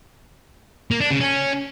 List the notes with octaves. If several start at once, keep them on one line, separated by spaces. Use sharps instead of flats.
A#3
D4
C#3
C#4